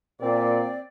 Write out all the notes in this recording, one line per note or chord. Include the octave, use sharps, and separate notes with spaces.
A#2 C4 D5